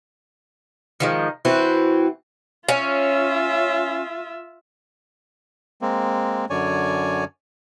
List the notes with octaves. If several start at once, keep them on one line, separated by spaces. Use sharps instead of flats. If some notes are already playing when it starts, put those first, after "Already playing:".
D#3 F3 G#3
E3 C4 E4 F#4
C#4 F4 E5
G#3 A#3 C4
F#2 D3 C#5 D5 G#5